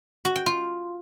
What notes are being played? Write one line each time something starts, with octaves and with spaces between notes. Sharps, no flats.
F#4
G5
F4